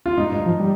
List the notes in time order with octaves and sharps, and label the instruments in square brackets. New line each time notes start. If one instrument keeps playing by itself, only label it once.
[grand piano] F4
[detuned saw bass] G#2 [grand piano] D#4
[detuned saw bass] G2
F3
G3